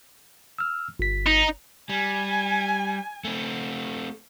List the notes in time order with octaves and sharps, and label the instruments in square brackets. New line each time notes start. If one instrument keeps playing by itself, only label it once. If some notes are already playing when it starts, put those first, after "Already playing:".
[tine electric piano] E6 F6
G1 B6
[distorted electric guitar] D#4
[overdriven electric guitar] G3 [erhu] G#5
[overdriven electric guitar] A3 C4